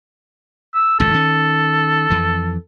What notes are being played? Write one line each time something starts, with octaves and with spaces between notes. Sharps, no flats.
E6
G#1 C#2 F#2 A4
D#3 C#4
F2 E3